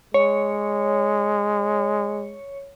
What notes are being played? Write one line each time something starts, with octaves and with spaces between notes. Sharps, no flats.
G#3 C#5